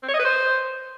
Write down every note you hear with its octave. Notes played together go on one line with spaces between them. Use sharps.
C4
C#5
D#5
B4
C5